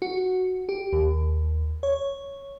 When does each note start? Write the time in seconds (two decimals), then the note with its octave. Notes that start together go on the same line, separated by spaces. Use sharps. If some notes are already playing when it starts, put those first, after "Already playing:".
0.02 F#4
0.69 G4
0.93 D#2
1.83 C#5